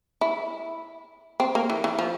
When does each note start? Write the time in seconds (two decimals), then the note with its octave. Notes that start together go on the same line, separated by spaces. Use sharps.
0.21 E4
1.40 C4
1.55 A#3
1.70 E3
1.84 E3
1.99 F3